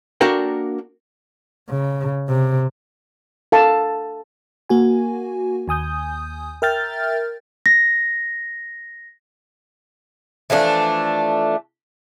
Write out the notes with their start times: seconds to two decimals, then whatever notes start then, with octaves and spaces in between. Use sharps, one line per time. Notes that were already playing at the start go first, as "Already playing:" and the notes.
0.21 A#3 D4 F#4 A4 A#4 G5
1.70 C#3
2.29 C3
3.52 A4 F5 A5
4.69 A#3 F#4 G#5
5.68 D#2 G#5 D#6 G6
6.62 A#4 E5 G5 F6 G6 A6
7.66 A#6
10.50 E3 F3 A3 D4